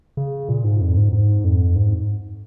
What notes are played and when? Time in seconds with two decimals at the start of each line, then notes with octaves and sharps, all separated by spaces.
0.17 C#3
0.49 A#2
0.64 G#2
0.81 F2
0.97 G#2
1.13 G#2
1.44 F2
1.76 G#2